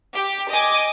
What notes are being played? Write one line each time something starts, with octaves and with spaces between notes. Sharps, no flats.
G4
D#5 G#5 D6